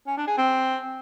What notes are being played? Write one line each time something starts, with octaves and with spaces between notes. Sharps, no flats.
C#4
D4
G#4
C4